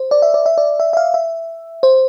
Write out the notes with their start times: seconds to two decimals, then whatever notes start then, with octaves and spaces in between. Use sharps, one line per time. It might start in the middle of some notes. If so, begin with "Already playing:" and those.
Already playing: C5
0.11 D5
0.22 E5
0.34 D5
0.46 E5
0.58 D5
0.80 E5
0.93 E5
0.97 F5
1.14 E5
1.83 C5